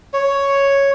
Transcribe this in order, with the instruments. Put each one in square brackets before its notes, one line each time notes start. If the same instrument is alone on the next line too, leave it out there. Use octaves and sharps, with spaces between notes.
[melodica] C#5